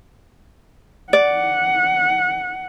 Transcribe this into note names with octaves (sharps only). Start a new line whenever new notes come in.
D5 F#5